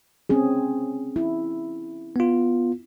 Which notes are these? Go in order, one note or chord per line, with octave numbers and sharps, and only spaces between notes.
C4 C#4 G#4
E4
B3 F4